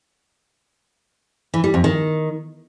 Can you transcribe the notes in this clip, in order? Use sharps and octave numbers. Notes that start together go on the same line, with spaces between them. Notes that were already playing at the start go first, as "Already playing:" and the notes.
E3
G3
F2
D#3